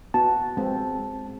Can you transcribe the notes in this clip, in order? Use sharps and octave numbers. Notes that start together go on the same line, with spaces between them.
B3 F#4 A5
G#3 C4